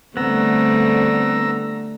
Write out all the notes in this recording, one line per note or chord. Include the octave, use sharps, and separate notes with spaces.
D3 G3 A3 B3 C4 A#5 E6